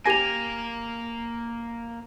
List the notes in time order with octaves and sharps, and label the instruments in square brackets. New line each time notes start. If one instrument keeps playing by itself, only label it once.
[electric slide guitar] A#3 [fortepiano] G4 G#5 [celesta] A#6 F7